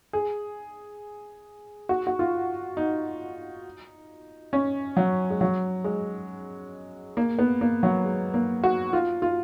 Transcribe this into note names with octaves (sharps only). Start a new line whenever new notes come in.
G#4
F#4
F#4
F4
D#4
C#4
F#3
G#3
F#3
G#3
A#3
B3
A#3
F#3
G#3
A#3
F#4
F4
F4